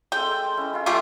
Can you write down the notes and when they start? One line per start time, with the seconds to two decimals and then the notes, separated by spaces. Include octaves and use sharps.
0.12 G#3 C4 A4 G5
0.57 C#4 E4 D#5
0.74 E4 F4
0.86 G3 A3 F4 G4 A4